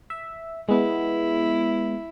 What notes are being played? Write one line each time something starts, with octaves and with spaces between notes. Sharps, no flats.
E5
G#3 B3 E4